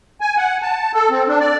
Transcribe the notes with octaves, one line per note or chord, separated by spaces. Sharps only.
G#5
F#5
A5
A4
C4
D4
D5